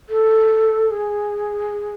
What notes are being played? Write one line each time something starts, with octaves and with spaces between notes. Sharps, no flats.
A4
G#4